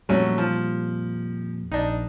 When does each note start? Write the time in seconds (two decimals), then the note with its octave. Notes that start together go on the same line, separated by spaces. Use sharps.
0.09 F2 A#2 F#3 G3 A3 C#4
0.38 F3
1.72 A#1 D4 D#4